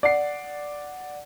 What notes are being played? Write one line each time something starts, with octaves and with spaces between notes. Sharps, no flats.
D5 F#5 C7